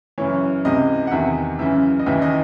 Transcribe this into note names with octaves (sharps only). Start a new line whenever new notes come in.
F#2 C#3 E3 C#5
C#2 C3 E3 D#5
F#5
E2 C3 D#3 E5
F#2 C#3 E3 E5
D#5
D#2 C#3 E3 E5
D#5